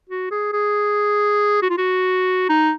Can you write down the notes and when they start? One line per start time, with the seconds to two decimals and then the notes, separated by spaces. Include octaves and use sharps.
0.10 F#4
0.31 G#4
0.53 G#4
1.62 F#4
1.70 F4
1.78 F#4
2.49 D#4